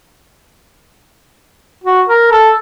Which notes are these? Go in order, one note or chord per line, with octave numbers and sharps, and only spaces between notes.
F#4
A#4
A4